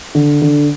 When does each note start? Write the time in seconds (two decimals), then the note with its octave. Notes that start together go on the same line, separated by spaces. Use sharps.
0.15 D3
0.42 D3